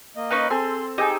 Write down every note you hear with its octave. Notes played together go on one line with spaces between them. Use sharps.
A#3 D#5
C#4 D#4 B4
C4 G#4 A4 C6
D#4 G4 G#4 G5 E6